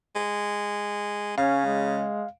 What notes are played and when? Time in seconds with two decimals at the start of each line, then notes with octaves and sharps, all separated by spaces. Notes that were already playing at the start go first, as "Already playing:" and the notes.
0.16 G#3
1.38 C#3 C#4 F5
1.66 G#3